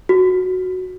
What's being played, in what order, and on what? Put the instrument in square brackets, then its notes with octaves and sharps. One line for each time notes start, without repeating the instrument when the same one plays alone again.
[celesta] F#4